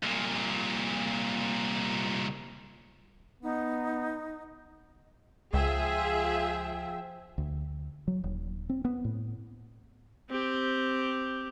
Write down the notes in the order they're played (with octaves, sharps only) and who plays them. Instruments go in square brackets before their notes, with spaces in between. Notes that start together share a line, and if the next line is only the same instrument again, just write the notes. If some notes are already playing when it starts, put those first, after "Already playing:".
[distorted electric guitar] C2 A#2
[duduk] B3 [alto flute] D#4
[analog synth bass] C#2 [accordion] F3 G5 [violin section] F4 G#4 [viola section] E5
[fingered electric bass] D2
F#3
D#1
C4
B3
A2
[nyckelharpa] C4 G4